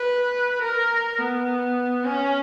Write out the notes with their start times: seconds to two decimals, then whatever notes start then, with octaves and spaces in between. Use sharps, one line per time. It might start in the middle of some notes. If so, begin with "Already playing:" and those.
Already playing: B4
0.62 A#4
1.19 B3
2.05 C#4